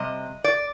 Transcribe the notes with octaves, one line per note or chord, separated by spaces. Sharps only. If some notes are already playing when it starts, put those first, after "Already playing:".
Already playing: C3 G3 D#5
D5